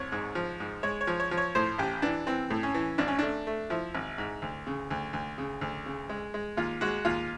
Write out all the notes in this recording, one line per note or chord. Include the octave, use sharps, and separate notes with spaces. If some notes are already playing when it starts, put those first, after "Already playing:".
Already playing: C2 C#5
G#2
F3
G#2
G#3 C#5
C#5
F3
C#5
F3
C#5
A2 C5
A1 G4
E3 D4
E3 C4
A2
C#4
E3
G#1 D4
C#4
A3 D4
A3
F3 E4
G#1
G#2
D2
C#3
D2
D2
C#3
D2
C#3
G#3
G#3
D#2 F4
G#3 F#4
D#2 F4